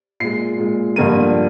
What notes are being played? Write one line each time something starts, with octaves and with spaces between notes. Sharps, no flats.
A#2 G#3 C7
A#2 G#3
G2 D3 F3 A#3 D#7